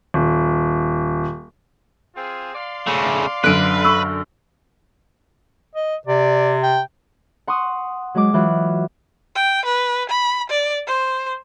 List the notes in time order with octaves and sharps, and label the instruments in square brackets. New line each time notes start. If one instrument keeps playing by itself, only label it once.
[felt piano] D#1
[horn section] C4 F4 G#4
D5 F5 C6
[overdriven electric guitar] C#3 A3
[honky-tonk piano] F#2 D3 [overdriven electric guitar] B4 [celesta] F#6 D7 D#7
[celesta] C#6 E6
[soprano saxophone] D#5
[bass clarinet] C3 [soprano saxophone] D5
[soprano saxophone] G5
[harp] F#5 C6 C#6 D#6
F#3 G#3 D6
E3 F#3 F4 F#6
[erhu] G5
B4
B5
D5
C5